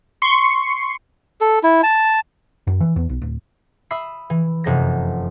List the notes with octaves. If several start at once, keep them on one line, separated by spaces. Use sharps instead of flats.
C6 C#6 C7 C#7
A4
E4
A5
F#2
E3
E2
B1
D1
E5 B5 D#6 E6 C7
E3
F1 F#2 A#6